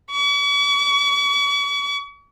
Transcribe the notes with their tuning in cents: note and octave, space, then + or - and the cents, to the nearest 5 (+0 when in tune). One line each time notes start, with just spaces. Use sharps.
C#6 +45